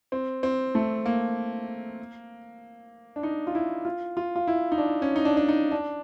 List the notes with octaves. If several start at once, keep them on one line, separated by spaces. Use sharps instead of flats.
C4
C4
A3
A#3
D4
D#4
F4
E4
F4
F4
F4
E4
D#4
D4
C#4
D#4
D4
D4
D#4
D4